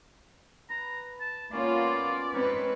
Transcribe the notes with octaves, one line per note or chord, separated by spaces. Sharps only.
B4 A#5
A5
A#3 B3 C#4 F4 D5
G#2 C4 A#4 B4 C#5 G#5